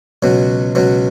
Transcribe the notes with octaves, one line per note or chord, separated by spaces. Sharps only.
C#2 B2 F#3
C#2 B2 F#3